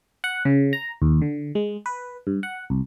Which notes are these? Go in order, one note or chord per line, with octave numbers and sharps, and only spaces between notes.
F#5
C#3
A#5
D#2
D3
G#3
B4
G2
F#5
C2